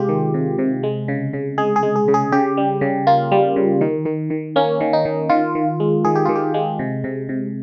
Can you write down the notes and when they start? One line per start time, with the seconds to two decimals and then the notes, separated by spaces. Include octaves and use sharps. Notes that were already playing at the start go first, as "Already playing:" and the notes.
Already playing: C3 G#3 F4 G4
0.09 D#3
0.34 C3
0.58 C3
0.83 G#3
1.08 C#3
1.33 C#3
1.58 G#3 G#4
1.76 G#4
1.83 G#3
1.96 G#4
2.08 C#3
2.14 G#4
2.32 C#3 G4
2.57 G3
2.81 C#3
3.07 A#3 F4
3.32 G3
3.56 C#3
3.81 D#3
4.05 D#3
4.30 D#3
4.56 A#3 C#4
4.81 D#3
4.93 D#4
5.05 D#3
5.29 D#3 F4
5.55 D#3
5.80 G#3
6.04 D#3 G#4
6.15 G4
6.25 D#3 F4
6.35 G4
6.54 G#3
6.79 C3
7.04 C3
7.29 C3